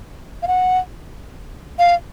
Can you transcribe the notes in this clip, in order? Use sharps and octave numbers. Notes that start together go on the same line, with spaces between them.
F5
F#5
F5